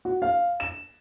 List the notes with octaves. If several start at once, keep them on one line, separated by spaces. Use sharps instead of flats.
F#4
F5
E7